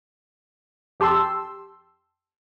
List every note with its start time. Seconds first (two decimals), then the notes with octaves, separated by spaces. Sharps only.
1.00 F2 G4 A5 C6 E6